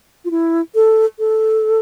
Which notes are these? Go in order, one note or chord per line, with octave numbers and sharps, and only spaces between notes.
F4
E4
A4
A4